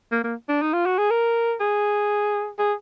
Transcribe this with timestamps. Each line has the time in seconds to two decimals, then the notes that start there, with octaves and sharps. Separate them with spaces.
0.12 A#3
0.24 A#3
0.49 D4
0.62 D#4
0.73 F4
0.86 F#4
0.98 G#4
1.10 A#4
1.60 G#4
2.58 G#4